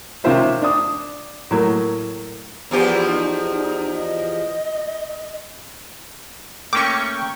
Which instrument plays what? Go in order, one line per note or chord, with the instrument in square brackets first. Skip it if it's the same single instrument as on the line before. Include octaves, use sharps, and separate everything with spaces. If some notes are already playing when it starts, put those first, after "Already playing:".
[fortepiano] C3 D#3 C#4 F4 C5 E5
D4 D#6
A2 F#3 A#3
[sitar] E2 F3 G4 [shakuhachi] B3
[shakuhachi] D#4
D#5
[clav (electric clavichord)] A3 A#3 C#4 [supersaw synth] G5 C#6 [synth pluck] D6